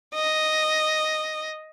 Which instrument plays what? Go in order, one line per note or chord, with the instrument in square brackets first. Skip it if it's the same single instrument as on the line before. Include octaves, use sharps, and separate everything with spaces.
[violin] D#5